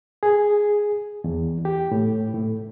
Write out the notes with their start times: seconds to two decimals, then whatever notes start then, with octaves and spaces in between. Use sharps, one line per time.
0.23 G#4
1.24 E2
1.65 G4
1.92 A2
2.34 A2